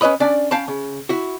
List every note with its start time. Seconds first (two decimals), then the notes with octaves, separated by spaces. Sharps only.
0.01 C#4 B4 C#5 D#5 B5
0.20 C#4 D4 D5
0.51 C#4 F5 G5 A5 B5
0.68 C#3
1.09 E4 F#4